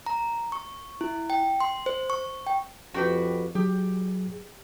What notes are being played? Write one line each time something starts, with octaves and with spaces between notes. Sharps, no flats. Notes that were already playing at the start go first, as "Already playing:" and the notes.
A#5
C#6
E4
G5
C6
C5
C#6
G5
F2 F#4 G4 B4
F#3 G4 G#4